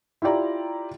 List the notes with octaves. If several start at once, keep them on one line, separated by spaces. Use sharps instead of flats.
E4 F4 G4 D5 A#5